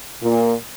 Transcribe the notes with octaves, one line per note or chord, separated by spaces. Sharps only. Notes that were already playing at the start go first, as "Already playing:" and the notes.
A#2